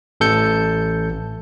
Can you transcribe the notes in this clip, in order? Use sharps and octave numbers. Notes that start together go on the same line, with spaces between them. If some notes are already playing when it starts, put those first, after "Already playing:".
A1 A4 G6 C#7